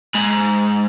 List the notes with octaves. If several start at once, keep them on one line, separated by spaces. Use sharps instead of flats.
G#2